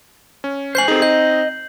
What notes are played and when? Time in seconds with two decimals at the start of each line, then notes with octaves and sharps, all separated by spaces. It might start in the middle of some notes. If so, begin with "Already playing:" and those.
0.44 C#4
0.75 C5 G#5 G6 C7 F#7
0.88 C4 D#4 G#4 A4
1.02 D#5 G6